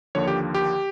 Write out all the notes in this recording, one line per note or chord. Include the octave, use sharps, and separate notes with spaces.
D#2 D3 F3 A#3 C#5
G4
G4